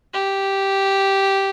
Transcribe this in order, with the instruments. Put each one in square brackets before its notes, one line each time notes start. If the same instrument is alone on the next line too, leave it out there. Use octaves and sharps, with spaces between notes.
[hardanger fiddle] G4